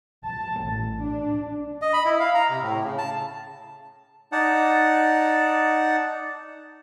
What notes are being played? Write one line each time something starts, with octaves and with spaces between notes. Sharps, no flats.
A5
A1
D4
D#5
B5
E4
F5
A#5
C3
A2
C#3
A5
D#4 D5 F#5 A5